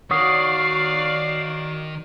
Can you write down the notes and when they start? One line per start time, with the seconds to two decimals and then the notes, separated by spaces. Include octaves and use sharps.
0.11 D#3 F#4 C#5 D5 F5 F#5 D#6 C7